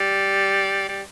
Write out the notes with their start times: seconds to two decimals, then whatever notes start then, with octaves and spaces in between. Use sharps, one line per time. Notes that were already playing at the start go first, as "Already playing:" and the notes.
Already playing: G3
0.89 G3